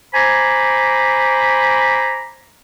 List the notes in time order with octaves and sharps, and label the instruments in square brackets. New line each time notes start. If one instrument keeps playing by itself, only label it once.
[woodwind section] C5 G#5 A#5 B5 D6